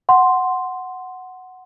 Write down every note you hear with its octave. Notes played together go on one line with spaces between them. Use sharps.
F#5 C6